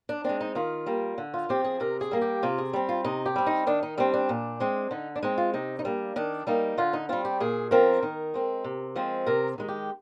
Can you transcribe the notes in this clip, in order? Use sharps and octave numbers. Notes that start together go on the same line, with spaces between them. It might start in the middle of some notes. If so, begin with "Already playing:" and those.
D4
G#3 C4 D4
D#4
D#3 F4
G3 A#3
D3
F4
F3 C4 G4
G#4
C3 A#4
G#4
G3 A#3
G4
C3 F4
G#4
G3 C4
F4
C3 D#4
G4
G3 C4
D#4
D#3 D4
D#4
G3 C4 D4
D4
A#2
G#3 C4
D3 D#4
D4
G#3 C4 D#4
F4
C3 D#4
D#4
G3 A#3 D4
D#3 D4
G3 A#3 D#4
D3 F4
D#4
G3 C4 F4
G4
A#2 G#4
F3 C4 A#4
D#3
G#3 C4
C3
F3 G#3 C4
C3 A#4
D#3 G#3
G4